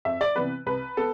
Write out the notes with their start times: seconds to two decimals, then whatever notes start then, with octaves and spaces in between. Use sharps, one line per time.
0.05 F2 E5
0.21 D5
0.36 C3 E3 B3 B4
0.66 C2 B4
0.97 B3 A4